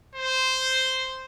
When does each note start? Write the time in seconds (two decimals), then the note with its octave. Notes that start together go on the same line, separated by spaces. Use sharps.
0.15 C5